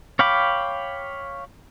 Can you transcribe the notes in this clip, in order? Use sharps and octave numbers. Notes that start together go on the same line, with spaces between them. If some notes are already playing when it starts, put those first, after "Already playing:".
C#5 F5 G5 B5 D6